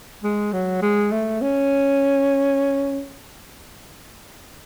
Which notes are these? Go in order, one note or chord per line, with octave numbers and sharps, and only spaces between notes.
G#3
F#3
G#3
A3
C#4